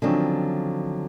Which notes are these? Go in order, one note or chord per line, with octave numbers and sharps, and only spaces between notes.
D3 D#3 F3 F#3 C4 C#4